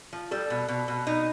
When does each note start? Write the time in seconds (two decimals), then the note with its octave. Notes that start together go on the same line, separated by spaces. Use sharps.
0.13 F3
0.31 G3 A4
0.50 B2
0.68 B2
0.88 B2
1.07 B2 D#4